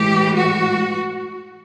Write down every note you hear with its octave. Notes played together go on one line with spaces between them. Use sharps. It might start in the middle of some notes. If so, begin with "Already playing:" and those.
Already playing: A2 E3 G#3 G4
F#4